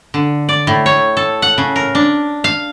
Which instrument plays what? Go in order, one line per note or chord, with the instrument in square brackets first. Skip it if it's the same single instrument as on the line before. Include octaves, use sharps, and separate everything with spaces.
[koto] D3
D5
A2
C#5
A4
F#5
C#3
A#4
D4
F5